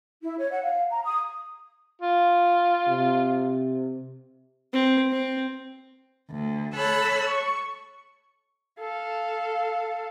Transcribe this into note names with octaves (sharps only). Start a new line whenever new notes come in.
E4
C#5
F#5
F5
A#5
D#6
F4
C3
C4
C4
D2
A4 C#5 B5 E6 F#6
C#6
A4 F5